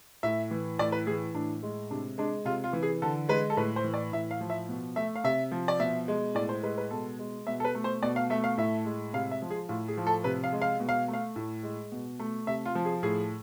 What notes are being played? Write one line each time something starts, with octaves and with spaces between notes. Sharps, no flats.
A2 E5
E3
A2 D5
B4
E3 G#4
A2 D4
G#3
C3 D4
G#3 D4
C3 F4
F4
E3
G#4
D3 A4
G#3 B4
A4
A2 B4
C5
E3
D5
A2 E5
F5
F3
E5
B2
A3 E5
F5
C3 E5
F3
D5
B2 E5
G#3
A2 D5
C5
G#3 B4
B4
B2 A4
G#3
B2 E5
A4
B4
A3
C5
B2 D5
F5
A3 E5
F5
A2 E5
G#3
C3 F5
E5
F3
G#4
A2 F4
G#4
F3
A4
C3 B4
F5
G#3
F5
B2
F5
A3
F5
A2
G#3
B2
A3
C3 E5
F4
F3
G#4
A2 G#4